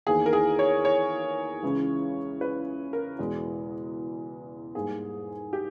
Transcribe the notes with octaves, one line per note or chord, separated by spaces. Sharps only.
E2 D#3 A#3 G#4
A#4
G#4
C#5
C#5
C#2 C#3 E3 G#3
B4
A#4
E2 B2 G#3
G#2 G3 A#3 G#4
G4